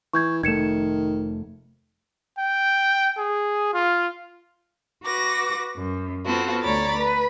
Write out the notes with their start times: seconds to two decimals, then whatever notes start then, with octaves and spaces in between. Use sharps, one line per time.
0.13 E3 C#6 G6 G#6
0.43 F1 D#3 A3 G#6 C#7 E7
2.39 G5
3.18 G#4
3.74 F4
5.04 F#4 B4 D6 A#6
5.77 F#2
6.26 B3 C4 F4 F#4 A4
6.63 D2 C#5 D5 A#5 B5 A6
6.99 B4